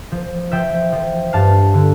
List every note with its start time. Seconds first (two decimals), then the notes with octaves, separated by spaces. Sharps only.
0.12 F3
0.52 F3 E5 G5
0.92 F3
1.33 G2 F5 A5
1.74 D3